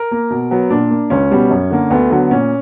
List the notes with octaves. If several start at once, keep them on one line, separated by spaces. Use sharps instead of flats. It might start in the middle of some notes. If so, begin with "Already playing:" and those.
Already playing: A#4
A#3
B2
F#3 B3
A#2 D4
A#3
C#2 C#4
B2 G3 B3
F#2
D3 A#3
D2 B3
D3 F#3 B3
A#2 C#4